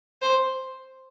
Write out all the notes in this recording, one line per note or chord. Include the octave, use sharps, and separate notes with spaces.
C5